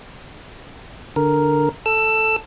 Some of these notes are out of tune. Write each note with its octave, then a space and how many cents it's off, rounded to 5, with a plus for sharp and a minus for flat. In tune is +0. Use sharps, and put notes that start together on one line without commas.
D3 +0 A#4 +0
A4 +0 E6 +15